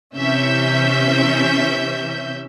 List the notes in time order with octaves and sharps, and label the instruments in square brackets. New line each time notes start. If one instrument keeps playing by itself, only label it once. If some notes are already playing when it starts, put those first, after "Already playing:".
[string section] C3 E3 C#4 E5 G6